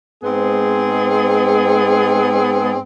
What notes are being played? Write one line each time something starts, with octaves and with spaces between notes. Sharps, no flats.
G#2 G#3 B3 C4 G#4